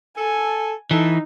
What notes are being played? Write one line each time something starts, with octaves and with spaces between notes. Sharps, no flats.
A4 G#5
E3 D#4 A4